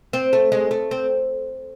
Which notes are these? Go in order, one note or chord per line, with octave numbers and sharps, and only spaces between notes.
C4
A3
G#3
A3
C4